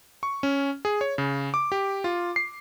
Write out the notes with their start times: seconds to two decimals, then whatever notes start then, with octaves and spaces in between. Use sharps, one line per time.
0.23 C#6
0.43 C#4
0.85 G#4
1.01 C#5
1.18 C#3
1.54 D6
1.72 G4
2.04 F4
2.36 C7